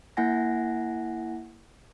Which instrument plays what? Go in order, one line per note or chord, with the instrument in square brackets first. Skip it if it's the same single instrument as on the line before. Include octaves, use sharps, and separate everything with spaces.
[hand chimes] A#3 E4 F#5 G#5 A#6